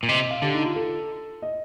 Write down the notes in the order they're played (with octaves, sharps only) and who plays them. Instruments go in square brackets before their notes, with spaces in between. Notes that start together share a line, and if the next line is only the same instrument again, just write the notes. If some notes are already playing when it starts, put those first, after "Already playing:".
[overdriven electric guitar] A#2
[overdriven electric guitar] C3 [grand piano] D#5
[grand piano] D#5
F5
[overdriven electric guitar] D3 [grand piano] G4
[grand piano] D#4
F4
A4
D#5